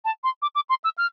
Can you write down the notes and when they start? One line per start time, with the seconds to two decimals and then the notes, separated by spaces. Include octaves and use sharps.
0.05 A5
0.24 C6
0.42 D6
0.55 D6
0.69 C6
0.84 E6
0.98 F6